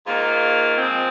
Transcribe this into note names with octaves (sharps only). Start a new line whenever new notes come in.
G#2 D#3 A#3 F4
F3 G#3 C4